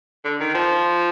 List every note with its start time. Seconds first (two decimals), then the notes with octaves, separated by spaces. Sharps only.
0.24 D3
0.40 D#3
0.54 F3